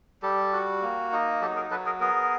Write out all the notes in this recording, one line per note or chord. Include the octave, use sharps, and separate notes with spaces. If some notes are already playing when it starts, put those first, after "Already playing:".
G3 G4 A4
F#4
A#3
D#4
F#3 G4 A4
G#4 A#4
F#3 A4 B4
G#4 A#4
B3 G#4 A#4